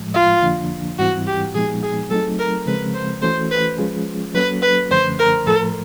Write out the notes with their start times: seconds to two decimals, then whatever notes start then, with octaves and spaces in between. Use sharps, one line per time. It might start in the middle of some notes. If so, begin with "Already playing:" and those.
Already playing: A2 F3 G#3
0.14 F4
0.42 F2 D3 F3 A#3 D4
0.98 G#2 E3 G3 C4 E4 F#4
1.27 G4
1.54 A#2 F3 G#3 B3 D#4 G#4
1.83 G#4
2.10 F#3 A3 C4 D#4 A4
2.39 A#4
2.66 C#3 F3 G#3 C4 B4
2.94 C5
3.22 E3 A3 C#4 F#4 A4 C5
3.51 B4
3.78 F3 G#3 C#4 F4 G#4
4.34 F#3 A#3 C#4 F#4 A4 B4
4.62 B4
4.91 F#2 D3 F3 A3 C#4 C5
5.19 A#4
5.47 A2 F3 A3 A4